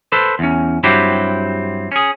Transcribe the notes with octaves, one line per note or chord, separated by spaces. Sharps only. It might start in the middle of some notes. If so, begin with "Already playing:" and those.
A4 B4 C5
E2 C#4
G2 F#3 C4 E4 G4
C#4 G#4